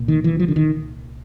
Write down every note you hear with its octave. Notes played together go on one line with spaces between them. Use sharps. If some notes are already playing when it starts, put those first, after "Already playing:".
Already playing: C2 A#2
D#3
E3
F3
D3
D#3